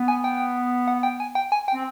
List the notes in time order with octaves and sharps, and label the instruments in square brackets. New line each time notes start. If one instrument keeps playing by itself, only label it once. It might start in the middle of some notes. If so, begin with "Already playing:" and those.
Already playing: [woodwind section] B3
[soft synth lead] G#5
G5
F#5
G5
G#5
G5
G#5
G5
[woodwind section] C4